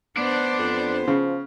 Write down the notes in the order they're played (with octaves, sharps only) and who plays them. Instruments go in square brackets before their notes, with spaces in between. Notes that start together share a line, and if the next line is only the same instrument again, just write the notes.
[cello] B3 C5 [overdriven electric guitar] D4 D5
[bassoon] F2
[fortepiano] C#3 [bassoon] F3